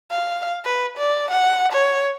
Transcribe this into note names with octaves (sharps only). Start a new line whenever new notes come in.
F5
B4
D5
F#5
C#5